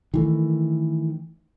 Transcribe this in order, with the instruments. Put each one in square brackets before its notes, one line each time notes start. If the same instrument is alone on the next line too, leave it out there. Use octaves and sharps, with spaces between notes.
[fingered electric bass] D#3 E3 A3